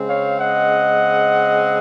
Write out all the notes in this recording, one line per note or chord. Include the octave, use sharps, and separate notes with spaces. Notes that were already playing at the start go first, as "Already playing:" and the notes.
Already playing: C#3 G#3 C4
C#5 F5
D#5 F#5